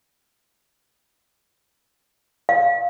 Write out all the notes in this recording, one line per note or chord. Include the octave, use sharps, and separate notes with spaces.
F5